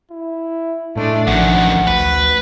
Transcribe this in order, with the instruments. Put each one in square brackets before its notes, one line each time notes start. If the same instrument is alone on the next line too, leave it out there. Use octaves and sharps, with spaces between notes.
[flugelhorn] E4
[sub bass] A2 [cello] G#3 D4 [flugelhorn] A3
[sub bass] A1 [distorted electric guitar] F#2 D#3 [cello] F3 [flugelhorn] F#5
[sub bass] D2 [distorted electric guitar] B4